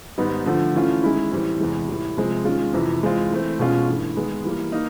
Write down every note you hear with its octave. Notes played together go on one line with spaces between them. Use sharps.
G#2 D#3 G3 B3 D#4
D3 F3 A3
E3 A3 C#4 F4
D#3 G#3 C#4 E4
A2 E3 G3 C4
E2 C3 E3 G#3
A2 E3 G3
C3 F3 G#3 C4
D#3 G#3 C#4 F4
F2 C3 E3
E3 G#3 C4 F4
E3 A3 C4
B2 G#3 C#4 F4
G2 E3 A3
D#3 G#3 B3
E3 G3 A#3
A#3 D#4